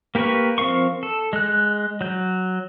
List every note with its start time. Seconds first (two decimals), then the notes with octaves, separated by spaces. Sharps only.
0.15 A#3 G4 A#4 B4 C#6
0.58 F3 C4 A#4 F5 C#6
1.03 A4
1.33 G#3 F#6
2.01 F#3 G6